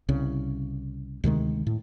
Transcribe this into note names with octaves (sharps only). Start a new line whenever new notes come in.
C2 C#3
D2 C3 D#3 G#3
A2